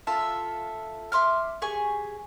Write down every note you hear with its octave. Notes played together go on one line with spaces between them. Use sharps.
F4 A4 E5
E5 C6 D6 F6
G4 G#4 G#5 C#6